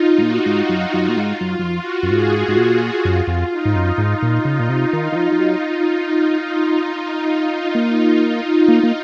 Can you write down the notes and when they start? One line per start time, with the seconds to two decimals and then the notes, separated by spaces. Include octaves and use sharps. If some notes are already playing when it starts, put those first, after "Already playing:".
Already playing: D#4 F4
0.18 G#2
0.22 A#2 F#4
0.46 G#2
0.54 F4
0.69 F#2
0.86 F#4
0.94 F#2
1.09 A#2
1.16 G#2 F4
1.41 F#2
1.47 F4
1.59 F#2
1.63 F2
1.79 F#4
2.03 F#2
2.11 G#2 G#4
2.48 G#2
2.57 A#2 F#4
3.05 F#2 F4
3.27 F2
3.51 D#4
3.65 G#2
3.75 F#2
3.98 G#2 F4
4.22 A#2
4.45 C#3
4.59 A#2
4.69 C3
4.93 D#3
5.12 D#3
5.16 F3
5.32 F3
5.39 F#3
7.75 A#3
8.68 A#3
8.83 A#3